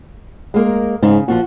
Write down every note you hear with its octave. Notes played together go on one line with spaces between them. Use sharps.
G#3 A#3 A#4
G#2 C#3
A#2 F3 F4 F#4